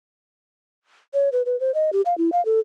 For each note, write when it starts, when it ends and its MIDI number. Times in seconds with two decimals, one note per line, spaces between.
1.14 1.29 73
1.32 1.42 71
1.46 1.59 71
1.60 1.74 72
1.74 1.91 75
1.93 2.02 67
2.06 2.16 77
2.18 2.30 64
2.32 2.43 77
2.45 2.60 69